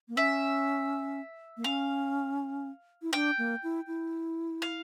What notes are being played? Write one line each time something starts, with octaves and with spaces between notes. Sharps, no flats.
A#3
C#4 E5
A#3
C#4 F5
E4
D4 G5
A#3
E4
E4
F5